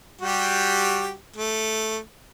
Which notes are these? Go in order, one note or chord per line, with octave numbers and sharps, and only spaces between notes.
G3 F#4 G4
A3